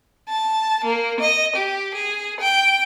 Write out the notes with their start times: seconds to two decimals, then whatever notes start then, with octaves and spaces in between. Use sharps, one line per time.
0.29 A5
0.84 A#3
1.20 D#5
1.56 G4
1.94 G#4
2.40 G5